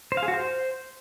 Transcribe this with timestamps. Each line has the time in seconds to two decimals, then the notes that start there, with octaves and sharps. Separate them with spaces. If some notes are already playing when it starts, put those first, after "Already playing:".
0.12 C5
0.17 F5
0.23 G#4
0.28 F#4
0.33 C5